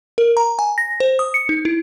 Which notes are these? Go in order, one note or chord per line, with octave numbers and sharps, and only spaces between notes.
A#4
A#5
G#5
A#6
C5
D#6
C#7
D#4
E4